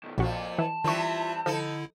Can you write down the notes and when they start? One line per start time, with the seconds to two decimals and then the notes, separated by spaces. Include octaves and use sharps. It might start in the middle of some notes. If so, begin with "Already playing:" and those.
0.04 B2 D#3
0.18 A#1 F2 A#2 F3 F#4
0.59 E3 A5
0.84 D#3 E3 G3 C4 F4 E5 C#6
1.46 D3 F3 D#4 E4 A4